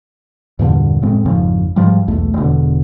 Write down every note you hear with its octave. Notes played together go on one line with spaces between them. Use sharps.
E2 G2 A#2 D3
F1 A2 G#3 C4
G#1 F2 C#3 F3
G#2 F3 G3
B1 E2 A3
E1 E2 D3